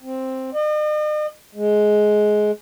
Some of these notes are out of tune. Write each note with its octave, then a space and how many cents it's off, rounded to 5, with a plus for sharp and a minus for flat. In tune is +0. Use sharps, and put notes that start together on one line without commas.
C4 +5
D#5 -45
G#3 +15